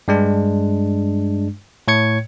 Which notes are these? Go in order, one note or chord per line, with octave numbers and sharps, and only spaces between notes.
G2 G#3 D4
A2 C#5 G#6 C#7